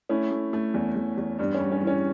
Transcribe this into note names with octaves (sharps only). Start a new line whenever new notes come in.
A3 C#4 E4
A3
A3
E2
E2
E2
G2 D4
C#4
G3
C#4
E3
C#4